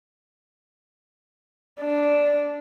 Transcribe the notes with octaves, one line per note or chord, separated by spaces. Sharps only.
D4